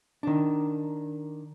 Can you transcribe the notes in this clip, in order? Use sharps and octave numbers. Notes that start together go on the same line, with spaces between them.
D#3 D4